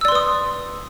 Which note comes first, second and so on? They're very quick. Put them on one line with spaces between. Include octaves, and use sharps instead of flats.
E6 D5 C6 B4 D#6